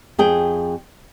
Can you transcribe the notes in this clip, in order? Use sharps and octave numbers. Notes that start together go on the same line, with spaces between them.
F2 G#4 G5